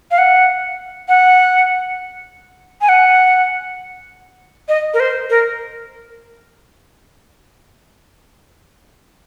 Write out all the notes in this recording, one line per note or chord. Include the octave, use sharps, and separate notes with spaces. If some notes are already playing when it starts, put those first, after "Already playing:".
F5
F#5
F#5
G#5
F#5
D#5
A#4
C5
A#4